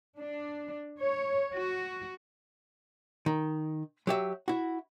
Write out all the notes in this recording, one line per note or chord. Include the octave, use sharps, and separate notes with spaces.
D4
C#5
F#4
D#3
F#3 G4 E5
E4 F#4